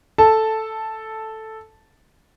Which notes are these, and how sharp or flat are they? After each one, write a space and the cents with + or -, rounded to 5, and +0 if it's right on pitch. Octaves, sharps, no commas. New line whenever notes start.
A4 +0 A5 +0